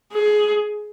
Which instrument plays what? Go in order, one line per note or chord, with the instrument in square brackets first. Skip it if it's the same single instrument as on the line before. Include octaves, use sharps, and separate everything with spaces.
[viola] G#4